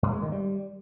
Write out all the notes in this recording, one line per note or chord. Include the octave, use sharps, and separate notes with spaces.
G2
G#3
D#3
G3